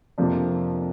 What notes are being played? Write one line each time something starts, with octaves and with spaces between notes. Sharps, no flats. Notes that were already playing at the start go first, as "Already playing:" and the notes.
F2 C3 F3 A#3 D4